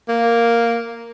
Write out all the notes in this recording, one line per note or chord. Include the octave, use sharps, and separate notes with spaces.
A#3